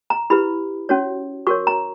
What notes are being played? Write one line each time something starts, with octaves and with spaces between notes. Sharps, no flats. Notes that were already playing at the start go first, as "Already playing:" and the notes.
A#5
E4 G4 B4 B5
C#4 F#4 C#5
F#4 A#4 C#5 C#6
A#5